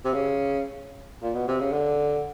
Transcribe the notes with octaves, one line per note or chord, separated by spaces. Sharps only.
C3
C#3
A#2
B2
C3
C#3
D3